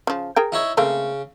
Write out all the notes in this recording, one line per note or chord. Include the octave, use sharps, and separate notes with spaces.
C#3 F3
G#4 A#4 G5
D#4 E4 C#5
C#3 A3 A#3 C4